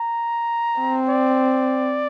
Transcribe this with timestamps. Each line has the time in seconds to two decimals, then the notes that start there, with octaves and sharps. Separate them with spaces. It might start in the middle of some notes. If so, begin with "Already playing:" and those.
Already playing: A#5
0.80 C4
1.09 D5